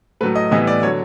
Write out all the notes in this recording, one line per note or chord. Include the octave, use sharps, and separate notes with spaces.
A2 F#3 A3 B4
D#5
A2 E3 G3 B3 D#5
D5
D3 F#3 C#5